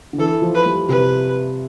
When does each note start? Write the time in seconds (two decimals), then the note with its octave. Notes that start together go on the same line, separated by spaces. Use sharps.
0.13 D3
0.18 E3 A4
0.42 F3
0.54 B4
0.66 G3
0.89 C3 B4